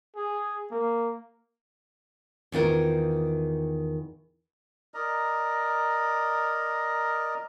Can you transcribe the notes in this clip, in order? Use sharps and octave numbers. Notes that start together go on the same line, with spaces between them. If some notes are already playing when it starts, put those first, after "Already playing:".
G#4
A#3
E2 D#3 F4 A#4
A#4 D5 D#5 A#5